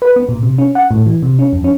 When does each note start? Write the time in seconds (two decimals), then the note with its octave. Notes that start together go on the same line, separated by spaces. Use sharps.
0.02 B4
0.16 B3
0.29 A#2
0.43 C3
0.58 C#4
0.75 F#5
0.91 A2
1.06 E3
1.23 C3
1.39 C#4
1.53 F2
1.64 C#4